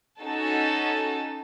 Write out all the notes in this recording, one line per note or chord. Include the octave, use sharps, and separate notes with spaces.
C#4 D#4 F#4 A4 A5